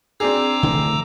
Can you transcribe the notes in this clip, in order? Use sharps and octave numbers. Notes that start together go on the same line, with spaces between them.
C4 D4 G#4 A#5 D6 E6
D3 E3 A3